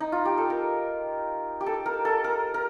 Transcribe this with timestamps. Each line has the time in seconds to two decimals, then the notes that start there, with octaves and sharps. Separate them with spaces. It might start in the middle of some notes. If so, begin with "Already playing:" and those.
0.00 D#4
0.12 F4
0.25 G4
0.38 A4
0.50 A#4
1.61 G4
1.66 A4
1.86 A#4
2.05 A4
2.24 A#4
2.54 A#4